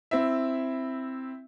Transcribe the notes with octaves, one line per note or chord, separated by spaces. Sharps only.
C4 E4 E5